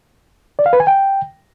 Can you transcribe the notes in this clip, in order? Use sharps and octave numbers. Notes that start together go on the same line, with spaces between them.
D5
F5
B4
G#5
G5